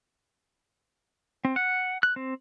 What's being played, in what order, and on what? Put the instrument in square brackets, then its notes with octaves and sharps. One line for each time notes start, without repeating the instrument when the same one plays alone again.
[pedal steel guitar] C4
F#5
F#6
C4